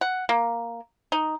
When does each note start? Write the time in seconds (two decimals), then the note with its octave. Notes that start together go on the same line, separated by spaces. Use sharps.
0.01 F#5
0.29 A#3
1.12 D#4